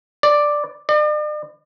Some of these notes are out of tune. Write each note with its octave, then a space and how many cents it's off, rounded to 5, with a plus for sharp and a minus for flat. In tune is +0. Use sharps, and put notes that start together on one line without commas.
D5 +5
D5 +45